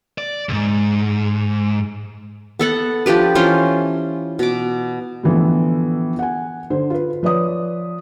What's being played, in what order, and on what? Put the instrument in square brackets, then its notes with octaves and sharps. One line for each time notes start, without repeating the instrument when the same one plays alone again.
[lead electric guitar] D5
C#2 G#2
[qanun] B3 A4 F#5
F3 D4 G4 B4
E3 C#4 F4 C5
B2 D6
[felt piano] A2 D3 E3 F3 B3 A4
F#5 G#5
D3 C5
F4 B4
F3 B4 C#5 D5 D#6